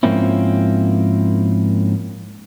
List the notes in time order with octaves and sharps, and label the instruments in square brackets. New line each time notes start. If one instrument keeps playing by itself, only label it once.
[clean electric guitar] G#2 F3 A#3 C4 C#4 E4